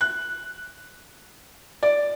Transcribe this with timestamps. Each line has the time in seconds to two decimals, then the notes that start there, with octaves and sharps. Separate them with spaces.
0.01 F#6
1.83 D5